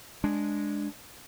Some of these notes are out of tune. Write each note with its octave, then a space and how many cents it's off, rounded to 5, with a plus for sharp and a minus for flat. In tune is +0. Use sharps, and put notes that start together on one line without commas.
G#3 +0 D4 +0